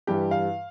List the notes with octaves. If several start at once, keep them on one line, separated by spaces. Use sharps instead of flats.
G2 E3 G3 G4
F5